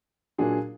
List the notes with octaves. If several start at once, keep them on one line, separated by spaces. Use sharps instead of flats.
A#2 F#3 D4 G#4